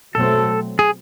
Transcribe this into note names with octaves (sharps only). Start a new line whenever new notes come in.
B2 F#3 A3 C4 A4
G#4